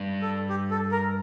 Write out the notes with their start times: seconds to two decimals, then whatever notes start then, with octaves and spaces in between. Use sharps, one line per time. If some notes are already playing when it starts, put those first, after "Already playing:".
Already playing: G2
0.22 A4
0.49 G4
0.71 A4
0.92 A#4